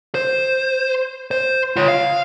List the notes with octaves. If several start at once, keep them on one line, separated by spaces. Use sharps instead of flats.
C5
C5
F4 C#5
F5